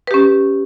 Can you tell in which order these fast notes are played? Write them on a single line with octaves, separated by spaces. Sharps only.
B4 G4 C#4